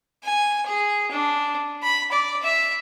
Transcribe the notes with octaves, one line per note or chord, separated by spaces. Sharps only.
G#5
G#4
D4
B5
D5
E5